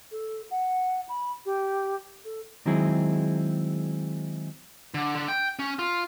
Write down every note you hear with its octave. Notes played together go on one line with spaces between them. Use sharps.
A4
F#5
B5
G4
A4
D#3 F#3 G#3 C4 E4 G#4
D3
D3
G5
C#4
F4